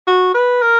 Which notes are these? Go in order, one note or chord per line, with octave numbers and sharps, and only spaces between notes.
F#4
B4
A#4